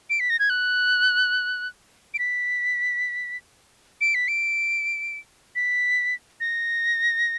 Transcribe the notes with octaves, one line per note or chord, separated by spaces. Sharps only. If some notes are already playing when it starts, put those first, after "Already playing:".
D7
B6
A#6
G#6
F#6
D7
B6
D7
B6
D7
B6
A#6